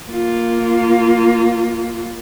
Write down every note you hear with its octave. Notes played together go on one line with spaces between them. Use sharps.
A#3 F4